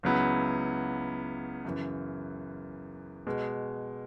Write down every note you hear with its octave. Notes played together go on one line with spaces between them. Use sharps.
C#2 C#3 F#3 B3 E4
F#2 C#3 E3
B2 G#3